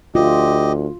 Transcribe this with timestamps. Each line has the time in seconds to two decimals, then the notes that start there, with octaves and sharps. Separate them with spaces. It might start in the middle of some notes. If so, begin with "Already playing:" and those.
0.15 D2 F4 G4 D#5